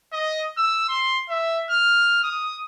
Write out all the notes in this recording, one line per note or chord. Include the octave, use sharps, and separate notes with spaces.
D#5
E6
C6
E5
F6
D#6